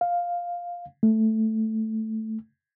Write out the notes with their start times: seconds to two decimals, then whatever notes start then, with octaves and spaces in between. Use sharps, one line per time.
0.01 F5
1.03 A3